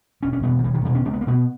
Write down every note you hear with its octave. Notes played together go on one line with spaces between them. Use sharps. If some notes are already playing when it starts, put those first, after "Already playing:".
E1 C#4
C#4
E2 B2 B3
D#3
E1 E3
D#3
E2 B2 E3
C#4
C#2 C#4
B3
A#3
B2 B3